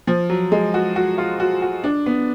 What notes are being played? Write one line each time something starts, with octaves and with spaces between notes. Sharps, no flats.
F3
F#3
G#3
F#4
F#4
F4
F#4
F#4
D4
B3